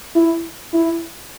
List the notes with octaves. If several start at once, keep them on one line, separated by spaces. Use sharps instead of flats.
E4
E4